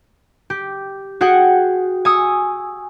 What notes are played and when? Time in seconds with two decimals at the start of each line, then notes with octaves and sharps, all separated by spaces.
0.50 G4
1.21 F#4 G#4 F#5 G5
2.05 G#5 C#6 D#6 E6